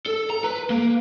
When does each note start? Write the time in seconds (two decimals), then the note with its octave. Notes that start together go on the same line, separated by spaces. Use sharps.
0.06 A4
0.30 A#5
0.44 B4
0.70 A#3